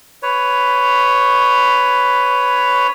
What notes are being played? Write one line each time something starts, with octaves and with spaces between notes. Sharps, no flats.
B4 C#5